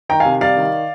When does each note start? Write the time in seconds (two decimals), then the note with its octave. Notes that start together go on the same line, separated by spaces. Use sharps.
0.09 D#3 G5 A#5
0.20 F5 G#5
0.25 C3
0.41 G3 D5 F5
0.56 D#3